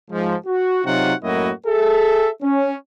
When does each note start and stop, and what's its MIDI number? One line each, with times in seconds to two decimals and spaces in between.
0.11 0.35 44
0.11 0.35 53
0.47 0.80 66
0.85 1.14 48
0.85 1.14 54
0.85 1.14 63
0.85 1.14 65
0.85 1.14 66
0.85 1.14 78
1.23 1.51 42
1.23 1.51 45
1.23 1.51 58
1.23 1.51 64
1.23 1.51 66
1.23 1.51 75
1.67 2.30 68
1.67 2.30 69
1.67 2.30 76
2.42 2.73 61